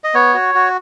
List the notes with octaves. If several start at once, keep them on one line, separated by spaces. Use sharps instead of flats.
D#5
B3 C#5
F#4
F#4